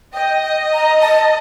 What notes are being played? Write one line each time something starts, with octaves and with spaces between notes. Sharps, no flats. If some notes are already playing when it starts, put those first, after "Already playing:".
D#5 G5
G5
A#5
A5